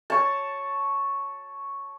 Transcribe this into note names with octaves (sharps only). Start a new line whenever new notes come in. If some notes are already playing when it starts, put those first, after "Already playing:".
C#5 A5